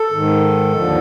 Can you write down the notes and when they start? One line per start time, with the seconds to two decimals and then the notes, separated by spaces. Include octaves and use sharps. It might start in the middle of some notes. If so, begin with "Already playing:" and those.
Already playing: A4
0.12 G#2 D#3
0.73 D#2 D3 F3